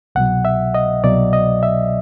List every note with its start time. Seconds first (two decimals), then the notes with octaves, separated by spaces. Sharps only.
0.15 C2 B2 F#3 F#5
0.45 E5
0.74 D#5
1.03 C2 B2 F#3 D5
1.33 D#5
1.63 E5